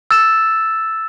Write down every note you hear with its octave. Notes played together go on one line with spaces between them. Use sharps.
E6 A6 E7